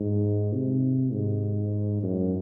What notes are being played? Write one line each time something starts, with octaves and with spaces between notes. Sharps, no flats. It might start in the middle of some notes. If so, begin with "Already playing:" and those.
Already playing: G#2
C3
G#2
F#2